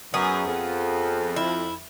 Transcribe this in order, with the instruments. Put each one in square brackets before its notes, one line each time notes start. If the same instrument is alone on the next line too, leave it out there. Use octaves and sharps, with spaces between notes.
[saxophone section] F#2 [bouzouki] B3 G#4
[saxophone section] F2
[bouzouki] E4